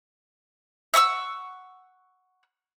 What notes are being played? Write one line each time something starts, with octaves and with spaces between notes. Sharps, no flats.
E5 F#5 C#6 E6